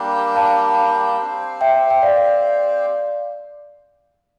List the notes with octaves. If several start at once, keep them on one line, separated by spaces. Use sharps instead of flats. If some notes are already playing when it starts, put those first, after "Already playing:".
Already playing: G3 A#3 D4 G4
F5 A5
C4 G4 C5
E5 G5
G5
D5 F5